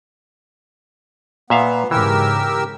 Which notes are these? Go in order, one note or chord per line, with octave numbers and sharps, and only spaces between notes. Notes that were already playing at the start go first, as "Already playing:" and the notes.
A#2 B3 E5 F5
G#2 C#3 E3 G4 A#4 E6